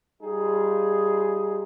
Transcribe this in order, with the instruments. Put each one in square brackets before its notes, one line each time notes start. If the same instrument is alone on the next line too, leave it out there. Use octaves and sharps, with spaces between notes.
[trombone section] G3 D#4 F4 G#4